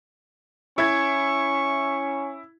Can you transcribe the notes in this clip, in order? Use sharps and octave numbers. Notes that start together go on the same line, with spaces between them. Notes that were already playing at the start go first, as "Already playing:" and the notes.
C#4 E4 C#6 G#6